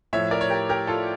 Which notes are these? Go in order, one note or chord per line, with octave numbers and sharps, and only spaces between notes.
A2 F3 C#5 E5
A#4 D5
C#5
G4 A#4
G4 A#4
F4 A4